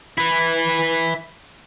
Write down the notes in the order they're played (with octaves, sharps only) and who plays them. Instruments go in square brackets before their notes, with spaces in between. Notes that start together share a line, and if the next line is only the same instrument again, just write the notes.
[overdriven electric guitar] E4 B4